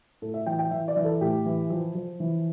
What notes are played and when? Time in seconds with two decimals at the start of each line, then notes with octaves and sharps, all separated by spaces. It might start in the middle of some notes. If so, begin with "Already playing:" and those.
0.22 A2 A4
0.34 E5
0.46 E3 G5
0.59 G5
0.71 E3 E5
0.88 D5
0.97 E3
1.04 A4
1.21 A2 G4
1.45 E3
1.70 F3
1.95 F3
2.20 E3